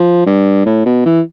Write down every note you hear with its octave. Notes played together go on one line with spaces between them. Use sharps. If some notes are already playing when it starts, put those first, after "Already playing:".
Already playing: F3
G2
A2
B2
E3